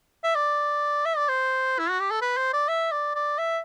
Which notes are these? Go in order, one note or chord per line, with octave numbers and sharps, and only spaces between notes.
E5
D5
E5
D5
C5
E4
F#4
G4
A4
B4
C5
D5
E5
D5
D5
E5